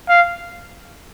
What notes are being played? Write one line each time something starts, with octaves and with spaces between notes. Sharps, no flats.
F5